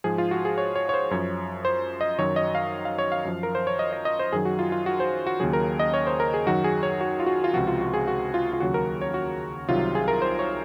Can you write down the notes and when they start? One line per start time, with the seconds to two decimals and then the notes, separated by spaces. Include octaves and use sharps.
0.04 G#2 F3 G#4
0.18 F4
0.31 F#4
0.45 G#4
0.58 C#5
0.75 C#5
0.89 C#5
0.94 C5
1.11 F#2 F3 C#5
1.65 C5
2.01 D#5
2.19 F#2 D#3 F#3 C#5
2.36 D#5
2.55 F5
2.85 F5
2.98 C#5
3.12 F5
3.25 F#2 F3
3.43 A#4
3.55 C5
3.67 C#5
3.79 D#5
3.92 D#5
4.05 D#5
4.19 C5
4.32 F#2 D#3 F#3 G#4
4.45 F#4
4.59 F4
4.72 F4
4.86 F#4
5.00 C5
5.27 F#4
5.40 D#2 C#3 F#3 G#4
5.53 A#4
5.79 D#5
5.94 C#5
6.07 C5
6.20 A#4
6.34 G#4
6.46 F#2 D#3 F#3 F#4
6.64 G#4
6.83 C#5
7.01 F#4
7.20 F4
7.26 F#4
7.44 F4
7.54 C#2 C3 F3 F#4
7.67 F4
7.81 F#4
7.94 G#4
8.08 F#4
8.34 F4
8.53 F4
8.60 D#2 C#3 F#3 F#4
8.74 A#4
9.01 C#5
9.14 F#4
9.68 C2 C3 D#3 F#3 F4
9.95 G#4
10.08 A#4
10.22 C5
10.39 C#5